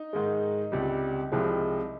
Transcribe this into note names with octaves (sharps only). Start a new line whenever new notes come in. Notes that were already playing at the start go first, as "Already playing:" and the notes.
Already playing: D#4
G#2 D#3 G#3
C#2 C3 G3
C2 C3 F3 G#3